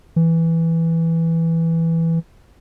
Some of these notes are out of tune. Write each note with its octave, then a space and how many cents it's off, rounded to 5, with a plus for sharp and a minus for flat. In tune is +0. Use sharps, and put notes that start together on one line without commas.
E3 +0